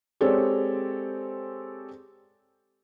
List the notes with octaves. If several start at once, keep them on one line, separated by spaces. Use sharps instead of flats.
G#3 C4 G4 A4 C#5 D5